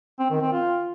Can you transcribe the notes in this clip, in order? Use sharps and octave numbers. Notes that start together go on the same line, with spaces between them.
C4
D#3
C4
F4